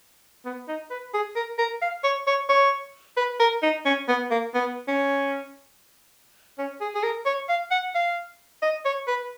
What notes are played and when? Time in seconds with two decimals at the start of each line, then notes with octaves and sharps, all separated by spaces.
0.45 B3
0.68 D#4
0.91 B4
1.14 G#4
1.36 A#4
1.58 A#4
1.82 F5
2.04 C#5
2.27 C#5
2.49 C#5
3.17 B4
3.40 A#4
3.63 D#4
3.85 C#4
4.08 B3
4.31 A#3
4.54 B3
4.88 C#4
6.58 C#4
6.81 G#4
6.95 G#4
7.03 A#4
7.26 C#5
7.49 F5
7.71 F#5
7.95 F5
8.62 D#5
8.85 C#5
9.08 B4